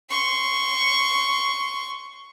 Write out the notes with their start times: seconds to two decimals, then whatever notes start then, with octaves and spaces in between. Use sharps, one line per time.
0.10 C6 C#6